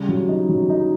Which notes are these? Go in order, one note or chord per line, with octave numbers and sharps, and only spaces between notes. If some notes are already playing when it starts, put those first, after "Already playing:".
Already playing: C#3 G3
F#3
D#4
F#3
D#4